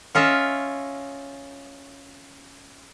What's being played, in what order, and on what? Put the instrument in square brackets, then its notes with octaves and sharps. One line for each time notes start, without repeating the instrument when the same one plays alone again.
[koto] C#4 F4 D#5 E5